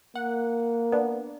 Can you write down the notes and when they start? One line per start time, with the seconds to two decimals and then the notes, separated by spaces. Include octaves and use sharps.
0.15 A#3 F#5
0.92 B3 D4